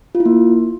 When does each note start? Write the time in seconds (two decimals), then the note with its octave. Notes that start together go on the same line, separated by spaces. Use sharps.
0.15 F4
0.20 E4
0.25 A#3